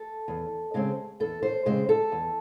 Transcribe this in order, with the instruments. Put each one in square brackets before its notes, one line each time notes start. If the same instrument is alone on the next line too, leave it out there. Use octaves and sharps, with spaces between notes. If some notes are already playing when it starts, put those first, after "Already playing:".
Already playing: [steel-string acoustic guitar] A4
E2
C#3 G#3 C4
E2 A4
C5
C#3 G#3 C4 C5
A4
E2